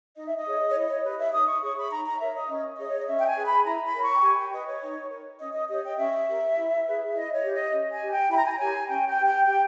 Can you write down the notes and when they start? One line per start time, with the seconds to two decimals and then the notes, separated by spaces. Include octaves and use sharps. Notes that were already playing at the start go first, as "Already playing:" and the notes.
0.15 D#4 D#5
0.27 E5
0.37 D#5
0.45 G#4 C#5
0.69 C#5
0.74 E4 D#5
0.88 C#5
1.03 G4 B4 D#5
1.18 E5
1.32 D#4 D#6
1.47 C#6
1.61 G#4 C#5 C#6
1.76 B5
1.90 D#4 A#5
2.05 A#5
2.19 A#4 C#5 E5
2.34 D#5
2.49 C#4
2.77 G#4 C#5 D#5
2.89 C#5
2.98 D#5
3.07 C#4 E5
3.19 G5
3.26 G#5
3.36 G#4 B4
3.46 B5
3.65 E4 A#5
3.84 B5
3.94 A#4 C#5
4.04 C#6
4.14 G5
4.23 G4 G#5
4.37 G5
4.52 B4 D#5
4.66 C#5
4.82 D#4
5.10 A#4 C#5
5.39 C#4 D#5
5.54 D#5
5.68 G4 C#5 D#5
5.83 G5
5.97 C#4 E5
6.27 G4 A#4
6.55 E4
6.84 G#4 B4
7.13 E4 D#5
7.33 C#5
7.43 G4 B4
7.52 D#5
7.72 C#4
7.91 G#5
8.01 G4 B4
8.11 G5
8.29 E4 B5
8.37 A#5
8.44 G#5
8.52 A#5
8.58 G4 A#4 C#5 G#5
8.87 C#4 G5
9.08 G5
9.17 G4 B4
9.27 G5
9.46 G4 G5